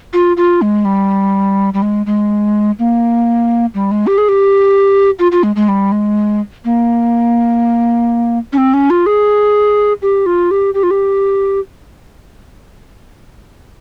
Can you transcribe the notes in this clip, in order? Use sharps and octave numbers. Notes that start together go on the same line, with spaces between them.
F4
F4
G#3
G3
G3
G#3
G#3
A#3
G3
G#3
G4
G#4
G4
F4
F4
G#3
G#3
G3
G#3
A#3
C#4
C4
C#4
F4
G#4
G4
F4
G4
G4
F4
G4